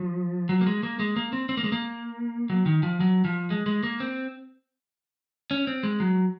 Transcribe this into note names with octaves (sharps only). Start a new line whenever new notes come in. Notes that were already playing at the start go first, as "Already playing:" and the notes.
Already playing: F3
F#3
A#3
G#3
A#3
G#3
A#3
C4
C4
A#3
G#3
A#3
F#3
D#3
F3
F#3
F3
G#3
G#3
A#3
C4
C#4
C4
G#3
F#3